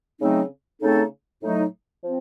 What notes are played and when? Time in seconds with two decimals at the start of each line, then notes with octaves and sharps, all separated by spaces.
0.20 C#3 F#3 A3 C4 D#4
0.80 C#3 A3 C4 D#4 A4
1.42 A2 F#3 A3 D#4
2.02 F3 C4